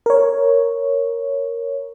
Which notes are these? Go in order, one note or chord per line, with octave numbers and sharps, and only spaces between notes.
A#4 C#5